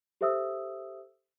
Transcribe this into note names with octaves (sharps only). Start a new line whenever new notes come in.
G4 A4 C5 E5 D#6 E6